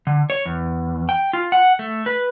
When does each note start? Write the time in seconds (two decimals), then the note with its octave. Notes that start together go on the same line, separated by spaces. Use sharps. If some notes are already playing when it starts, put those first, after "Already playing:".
0.07 D3
0.30 C#5
0.45 E2
1.09 G5
1.33 F4
1.52 F#5
1.79 A3
2.06 B4